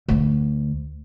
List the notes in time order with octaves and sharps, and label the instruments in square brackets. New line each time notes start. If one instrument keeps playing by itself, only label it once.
[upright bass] D2 D3